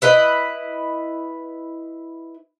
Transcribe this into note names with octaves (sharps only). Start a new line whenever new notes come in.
E4 B4 D#5